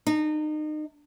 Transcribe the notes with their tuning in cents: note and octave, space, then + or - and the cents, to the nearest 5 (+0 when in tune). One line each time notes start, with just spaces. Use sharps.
D#4 -30